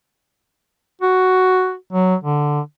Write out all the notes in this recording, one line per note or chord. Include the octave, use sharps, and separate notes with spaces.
F#4
F#3
D3